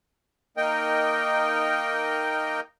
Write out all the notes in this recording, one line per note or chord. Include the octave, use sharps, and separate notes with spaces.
A#3 D#4 A#4 D#5 G5